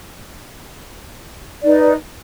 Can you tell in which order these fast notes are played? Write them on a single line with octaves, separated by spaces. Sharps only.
D5 D#4 B4